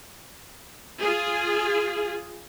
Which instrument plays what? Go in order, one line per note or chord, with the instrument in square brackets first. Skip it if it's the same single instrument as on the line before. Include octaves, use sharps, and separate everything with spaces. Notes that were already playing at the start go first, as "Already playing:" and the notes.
[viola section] F4 G#4